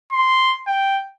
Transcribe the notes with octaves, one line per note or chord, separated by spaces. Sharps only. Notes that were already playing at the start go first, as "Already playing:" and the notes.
C6
G5